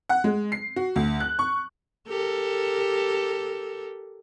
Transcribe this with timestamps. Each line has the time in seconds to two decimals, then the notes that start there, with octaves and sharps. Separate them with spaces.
0.09 F#5
0.24 G#3
0.52 C7
0.76 F#4
0.96 D2
1.20 F#6
1.39 C#6
2.08 G4 A4 A#4